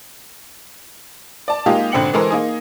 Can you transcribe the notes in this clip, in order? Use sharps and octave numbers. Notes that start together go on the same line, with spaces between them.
D5 A5
G#3 A#3 D#4 F4 G4
G#1 D3 C4 G5 C#7 F#7
E3 G#3 A4 A#4 C5 C6
A#3 D#4 G#4